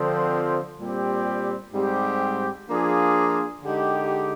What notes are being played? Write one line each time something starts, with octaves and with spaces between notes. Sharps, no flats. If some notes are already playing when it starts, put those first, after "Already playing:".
Already playing: D3 F3 C4
A#2 G3 C4 G4
G#2 G3 C4 G4
F3 A#3 D4 F4 G#4
D3 G#3 D#4 G4